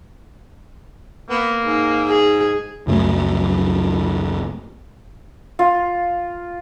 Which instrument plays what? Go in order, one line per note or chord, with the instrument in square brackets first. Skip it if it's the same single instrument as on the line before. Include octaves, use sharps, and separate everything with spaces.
[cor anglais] A#3 [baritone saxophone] B3
[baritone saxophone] G#2
[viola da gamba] G#4
[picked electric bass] C#2 F#2 F#3 A3
[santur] F4